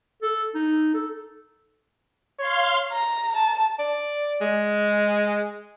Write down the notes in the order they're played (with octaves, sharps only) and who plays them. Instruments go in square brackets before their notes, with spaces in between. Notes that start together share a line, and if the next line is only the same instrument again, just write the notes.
[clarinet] A4
D#4
A4
[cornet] C#5 [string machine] F5 C6
[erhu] A#5
A5
[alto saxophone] D5
G#3